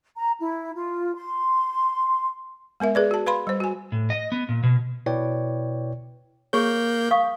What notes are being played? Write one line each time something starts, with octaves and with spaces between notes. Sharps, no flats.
A#5
E4
F4
C6
G#3 B3 A#4 E5
G#4 B4 D5
F#4 A5
B4 F5 B5 C6
G3 C5
F#4 G#5
A2
D#5
B3
A#2
B2
B2 E4 B4 C#5 D5 G5
A#3 G#4 C#5 C#6 G6
F5 C#6 D#6